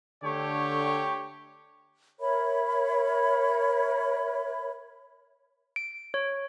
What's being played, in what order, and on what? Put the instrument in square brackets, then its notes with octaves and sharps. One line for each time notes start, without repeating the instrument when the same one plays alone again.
[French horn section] D3 [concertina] A3 [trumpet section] G4 C#5 G5
[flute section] A#4 C#5 E5 B5
[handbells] D7
C#5